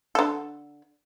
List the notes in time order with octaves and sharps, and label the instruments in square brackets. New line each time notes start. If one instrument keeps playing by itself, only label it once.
[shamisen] D3 A4